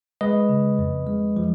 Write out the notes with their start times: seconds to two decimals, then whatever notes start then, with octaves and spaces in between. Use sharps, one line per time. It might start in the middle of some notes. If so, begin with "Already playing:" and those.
0.21 G#3 B4 D#5
0.49 C#3
0.79 F2
1.07 G#3
1.37 F3